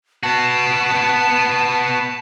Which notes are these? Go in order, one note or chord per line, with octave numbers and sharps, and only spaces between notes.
B3 F#4 A5